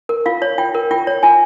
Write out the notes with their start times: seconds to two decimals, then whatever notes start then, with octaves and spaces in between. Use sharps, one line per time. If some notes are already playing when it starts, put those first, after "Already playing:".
0.09 A#4
0.26 F4 F5
0.42 C#5
0.58 F4 G5
0.74 A#4
0.91 F4 G5
1.07 C#5
1.23 F4 G#5